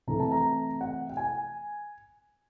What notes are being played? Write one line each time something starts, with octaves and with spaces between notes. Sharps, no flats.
C3 E3 A3 A#5
A5
A#5
F#5
G5
G#5